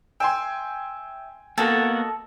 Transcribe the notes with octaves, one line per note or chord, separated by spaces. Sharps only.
E5 G5 G#5 C6
A#3 B3 F#4 A4 D#5